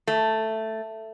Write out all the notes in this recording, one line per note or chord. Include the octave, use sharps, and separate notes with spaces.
A3